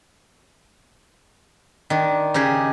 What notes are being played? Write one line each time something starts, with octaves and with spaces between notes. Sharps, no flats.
D#3 D4
C#3 D#4 G4 G#4